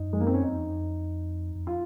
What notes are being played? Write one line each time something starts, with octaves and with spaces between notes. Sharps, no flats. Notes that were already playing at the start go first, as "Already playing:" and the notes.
Already playing: F#2 D#4
G#3
A#3
C4
C#4
F2 D#4
F#2
F2
F2
F4